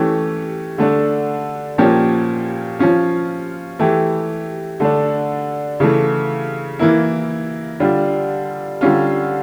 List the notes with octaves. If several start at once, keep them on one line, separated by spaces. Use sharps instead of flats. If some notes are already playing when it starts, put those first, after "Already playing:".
Already playing: E3 A3 C#4 G4
D3 A3 D4
A#2 F3 A#3 C#4 G4
F3 C#4 F4
E3 A3 E4 G4
D3 A3 D4
C#3 E3 A3
E3 A#3 E4
D3 G3 D4 F4
D3 G3 C#4 F4